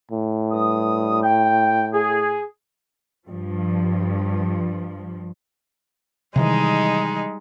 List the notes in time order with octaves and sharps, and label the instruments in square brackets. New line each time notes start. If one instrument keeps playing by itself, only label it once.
[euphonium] A2
[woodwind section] G2 G3 D#6
G5
G#4
[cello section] G2 F3
[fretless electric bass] C3 D#3 E3 [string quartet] G3 G#3 D#4